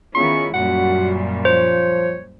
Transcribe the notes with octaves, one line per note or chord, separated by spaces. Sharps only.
D#3 B3 C#4 E4 F4 G#4 C#6
F#2 A#2 F#3 G3 F#4 F#5
F3 C5 C#5